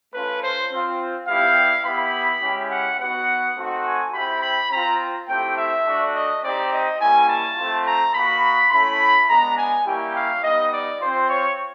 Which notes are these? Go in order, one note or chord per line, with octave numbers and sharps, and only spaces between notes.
A3 C#4 F4 B4
C5
C4 F4
G3 B3 E4 G4 F5
B3 E4 G4 B5
G#3 C#4 E4 G4
F#5
B3 D#4 F#4 F#5
A3 C4 D#4 F#4
G#5
C4 E4 G4 B5
B5
C4 F4 A#5
A3 C4 E4 G4 G5
E5
A3 D4 F#4
D#5
C4 D#4 G4 D5
D#5
G3 A#3 C#4 E4 G#5
A5
A3 C4 F4
A#5
A#3 D#4 F#4 B5
A3 C#4 E4 B5
G#3 B3 D4 A#5
G#5
G3 A#3 C#4 E4 G4 G5
F5
G3 B3 D#4 D#5
D5
C4 F4 C5
C#5